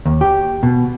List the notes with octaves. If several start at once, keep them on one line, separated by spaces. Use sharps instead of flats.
D#2
G4
B2